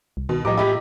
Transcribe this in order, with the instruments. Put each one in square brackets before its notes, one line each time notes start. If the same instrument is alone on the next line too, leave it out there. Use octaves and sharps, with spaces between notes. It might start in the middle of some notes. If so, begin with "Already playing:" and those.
[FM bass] C2
[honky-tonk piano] B2 [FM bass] D#3
[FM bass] A2 [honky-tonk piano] F3 G3 [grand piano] D#5 A#5 D6
[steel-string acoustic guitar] F4 G4 G#4 [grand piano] D#5 B5 [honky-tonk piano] E5